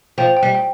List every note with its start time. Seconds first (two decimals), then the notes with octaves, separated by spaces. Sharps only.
0.18 F3 G5
0.37 G5
0.43 G3
0.55 G5